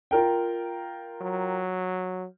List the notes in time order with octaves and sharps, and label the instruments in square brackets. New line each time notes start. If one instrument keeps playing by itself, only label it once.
[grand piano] F4 A#4 G5
[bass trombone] F#3